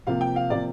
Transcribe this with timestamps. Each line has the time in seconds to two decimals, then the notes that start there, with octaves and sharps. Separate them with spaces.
0.07 C3 F3 A#3 F5
0.21 G5
0.36 F5
0.50 C3 F3 A#3 D5